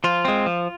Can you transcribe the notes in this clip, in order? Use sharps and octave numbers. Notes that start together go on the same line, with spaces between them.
F3 F4
G#3 C4
F3